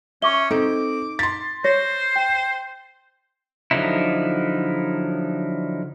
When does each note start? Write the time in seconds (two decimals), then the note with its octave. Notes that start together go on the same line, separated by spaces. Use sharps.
0.22 C#4 E5 C#6 D6 G7
0.51 C4 D#4 A4 D6
1.19 C6 A6 B6
1.64 C5 C#5 A#6
2.16 G5
3.71 D3 F3 F#3 D#4 E4